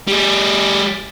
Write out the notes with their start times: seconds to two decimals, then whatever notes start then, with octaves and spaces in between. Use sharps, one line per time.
0.07 G3 G#4